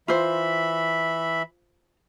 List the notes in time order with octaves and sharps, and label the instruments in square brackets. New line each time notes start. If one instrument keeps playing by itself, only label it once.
[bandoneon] E3 E5 B5 [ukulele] F4 C5